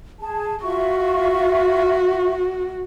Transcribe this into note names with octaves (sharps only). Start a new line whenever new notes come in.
G#4 A5
F4 F#4 E5 C#6